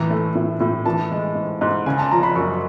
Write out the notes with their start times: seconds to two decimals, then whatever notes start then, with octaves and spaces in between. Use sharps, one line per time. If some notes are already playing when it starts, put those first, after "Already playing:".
Already playing: A2 E3 A#5
0.10 A3
0.35 A2
0.60 A2
0.86 E3 A5
1.11 G#3
1.35 G#2
1.61 G#2
1.86 C#3 G#5
1.99 A5
2.11 F3 A#5
2.23 B5
2.35 F#2 C#6